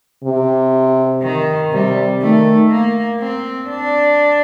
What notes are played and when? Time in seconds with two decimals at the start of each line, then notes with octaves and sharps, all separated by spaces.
0.24 C3
1.23 D#3
1.72 C3 G3
2.22 D#3 A3
2.70 A#3
3.20 C4
3.69 D4